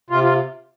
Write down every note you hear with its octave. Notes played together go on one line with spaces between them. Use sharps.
C3 F4
F4